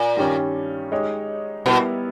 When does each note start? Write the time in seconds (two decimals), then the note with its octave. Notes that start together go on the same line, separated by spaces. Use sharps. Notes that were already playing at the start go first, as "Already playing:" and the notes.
Already playing: A#2
0.17 G2 D#3 G3 C#4 G4
0.92 G#3 D#4 G4 C#5
1.66 B2 G3 B3 E4 A#4 E5